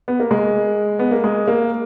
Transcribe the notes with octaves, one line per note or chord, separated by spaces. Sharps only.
B3
A#3
G#3
B3
A#3
G#3
A#3